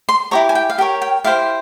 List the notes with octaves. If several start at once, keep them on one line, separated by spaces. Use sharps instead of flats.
C6
E4 G4 C#5 A#5
G#5
G5
F5
G4 A#4 C#5 G5
G5
E4 G4 C5 F5